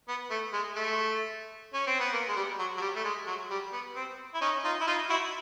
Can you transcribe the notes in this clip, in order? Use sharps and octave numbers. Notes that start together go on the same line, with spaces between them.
B3
A3
G#3
A3
C#4
C4
B3
A#3
G#3
G3
F#3
F#3
G3
A3
G#3
F#3
G3
B3
C4
E4
C#4 D#4
D#4 F4
E4
D#4 F4
E4 F#4